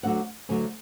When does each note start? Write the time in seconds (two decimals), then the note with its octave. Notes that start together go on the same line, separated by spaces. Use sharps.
0.03 D2 D3 F#3 F#5
0.49 D2 D3 F#3 G#5